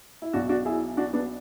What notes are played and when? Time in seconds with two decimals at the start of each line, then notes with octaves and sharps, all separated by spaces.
0.22 E4
0.33 B1 B2 D4 F#4
0.49 D4 F#4
0.65 E4 G#4
0.97 D4 F#4
1.13 B3 D4